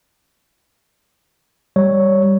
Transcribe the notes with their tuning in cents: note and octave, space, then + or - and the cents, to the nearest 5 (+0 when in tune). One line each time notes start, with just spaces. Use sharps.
G3 +0 C#5 +0